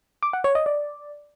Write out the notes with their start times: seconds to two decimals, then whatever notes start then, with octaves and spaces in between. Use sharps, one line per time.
0.23 D6
0.33 F#5
0.44 C#5
0.55 D#5
0.66 D5